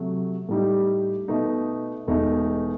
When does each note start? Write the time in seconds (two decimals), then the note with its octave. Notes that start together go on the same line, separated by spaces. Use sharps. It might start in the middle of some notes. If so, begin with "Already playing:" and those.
Already playing: C3 F#3 A3
0.49 A2 G3 D#4 G4
1.28 B2 A3 D#4
2.07 E1 E2 B2 A3 D#4